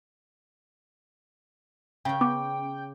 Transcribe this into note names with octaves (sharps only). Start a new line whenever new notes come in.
C#3 C#4 G5
B3 D6